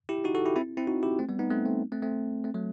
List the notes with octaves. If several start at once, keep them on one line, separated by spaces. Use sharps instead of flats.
E4 G4
D#4 F#4
F#4 A4
E4 G4
C4 E4
C4 E4
D#4 F#4
E4 G4
A3 C4
G3 B3
B3 D#4
A3 C4
A3 C4
A3 C4
A3 C4
A3 C4
F#3 A3